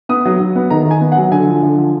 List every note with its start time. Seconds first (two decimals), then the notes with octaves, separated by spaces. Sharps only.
0.09 B3 D#6
0.25 F#3
0.40 F#3
0.55 B3
0.70 D#3 A#5
0.86 D#3 G#5
1.01 B3
1.12 F#5
1.17 F#3
1.31 D3 G#5
1.47 F3
1.63 D3
1.78 F3